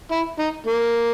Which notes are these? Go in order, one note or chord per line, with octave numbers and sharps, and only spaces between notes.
E4
D#4
A#3